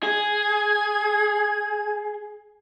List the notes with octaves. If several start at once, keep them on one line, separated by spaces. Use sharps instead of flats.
G#4 G#6